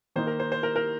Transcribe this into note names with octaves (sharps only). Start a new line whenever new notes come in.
D#3 A#3 D#4 C5
A#4
C5
C5
A#4
A#4